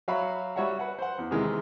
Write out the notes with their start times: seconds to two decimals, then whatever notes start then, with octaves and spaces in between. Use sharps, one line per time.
0.08 F#3 F#4 E5 F5 B5
0.56 G3 F#4 C#5 E5 F#5
0.79 B4 F#5
0.99 C5 F#5
1.18 E2
1.31 C3 D#3 E3 G#3 F6